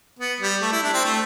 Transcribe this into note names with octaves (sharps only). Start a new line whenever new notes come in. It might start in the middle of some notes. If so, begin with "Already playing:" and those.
B3
G3
A3
E4
D4
C4
A3